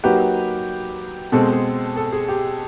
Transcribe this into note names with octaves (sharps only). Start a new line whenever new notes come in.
F#3 A#3 D#4 F#4 G4 B4
B2 G#3 C4 A4
G#4
A4
G#4
G4